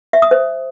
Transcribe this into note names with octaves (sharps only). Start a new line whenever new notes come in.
E5
D#6
C5